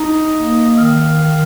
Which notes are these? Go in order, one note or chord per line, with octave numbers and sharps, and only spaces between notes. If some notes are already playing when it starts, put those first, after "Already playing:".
Already playing: D#4 D#5
A#3
D#5
D#3 F5
D#3